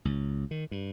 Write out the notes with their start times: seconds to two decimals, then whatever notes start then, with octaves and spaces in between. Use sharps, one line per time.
0.05 C#2
0.51 D#3
0.71 G2